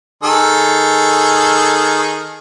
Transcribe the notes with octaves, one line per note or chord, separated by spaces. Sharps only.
D#3 G#4 A4